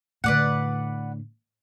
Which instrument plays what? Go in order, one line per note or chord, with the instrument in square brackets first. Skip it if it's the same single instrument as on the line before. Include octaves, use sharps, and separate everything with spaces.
[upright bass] A2 D3 [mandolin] B4 D5 F#5